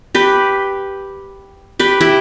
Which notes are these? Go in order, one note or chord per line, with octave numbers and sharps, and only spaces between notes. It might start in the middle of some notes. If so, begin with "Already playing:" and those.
G4 B4
G4 B4
E4 G4